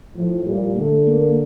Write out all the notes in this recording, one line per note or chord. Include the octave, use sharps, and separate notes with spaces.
A2 F3
A#2 G3
D3 A3
A#3